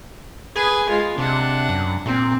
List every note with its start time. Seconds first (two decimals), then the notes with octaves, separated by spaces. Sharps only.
0.56 G#4 B4 G#5
0.90 G#3 F4
1.18 C3 D4 F#5
1.69 F#2
2.06 A#2 C4